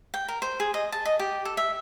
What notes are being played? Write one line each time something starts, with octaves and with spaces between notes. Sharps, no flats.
G5
A#4
C5
G#4
D#5
A5
D#5
G4
A4
E5